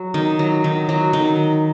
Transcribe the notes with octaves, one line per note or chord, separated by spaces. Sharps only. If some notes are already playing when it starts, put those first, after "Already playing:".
Already playing: F#3
D#3
F#3
D#3
F#3
D#3